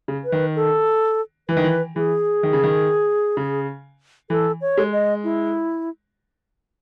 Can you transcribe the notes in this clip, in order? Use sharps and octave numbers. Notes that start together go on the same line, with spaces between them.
C#3
B4
D#3
A4
E3 B4
D#3
E3
E3 G#4
D#3
C#3
D#3
C#3
E3 A4
C#5
G#3
D#5
E4